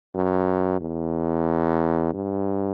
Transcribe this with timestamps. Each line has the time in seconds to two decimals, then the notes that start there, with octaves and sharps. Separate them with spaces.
0.15 F#2
0.80 E2
2.13 G2